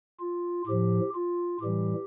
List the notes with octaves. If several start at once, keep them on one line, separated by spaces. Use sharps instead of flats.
F4
A2 F3 G4
F4
A2 E3 G3 G4